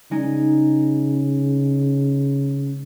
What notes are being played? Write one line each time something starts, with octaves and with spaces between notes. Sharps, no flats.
C#3 G#3 D#4